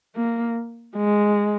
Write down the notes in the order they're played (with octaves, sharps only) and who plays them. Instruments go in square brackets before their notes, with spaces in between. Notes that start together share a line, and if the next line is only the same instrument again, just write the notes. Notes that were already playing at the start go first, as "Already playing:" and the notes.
[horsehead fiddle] A#3
G#3